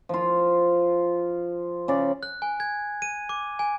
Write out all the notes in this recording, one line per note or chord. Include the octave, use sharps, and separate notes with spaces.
F3 F4
C#3 D5
F#6
G#5
G#6
D#7
D6
G#5